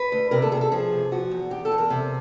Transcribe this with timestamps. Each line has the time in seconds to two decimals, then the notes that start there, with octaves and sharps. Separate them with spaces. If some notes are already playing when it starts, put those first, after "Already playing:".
Already playing: B4
0.12 D2
0.31 C3 A#4
0.42 A4
0.52 C3 G#4
0.61 A4
0.72 F3 G#4
0.92 C3
1.11 F3 F#4
1.31 E2
1.51 E2 G4
1.65 A4
1.72 E2
1.78 A#4
1.90 C3